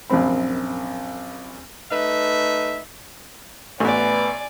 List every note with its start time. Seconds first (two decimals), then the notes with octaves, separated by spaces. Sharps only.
0.10 A#1 F#2 C3 C4 B5
1.90 A3 D#4 B4 E5
3.80 A1 A3 B3 B4 D5 G#5